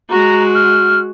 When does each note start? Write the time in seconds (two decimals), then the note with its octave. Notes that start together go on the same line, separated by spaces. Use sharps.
0.10 G#3 F#4 A#5
0.54 F6